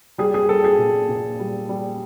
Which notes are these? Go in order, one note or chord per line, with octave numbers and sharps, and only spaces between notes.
G3 G#4
G#4
G3 A4
G#4
A#2
A#2
G3
G3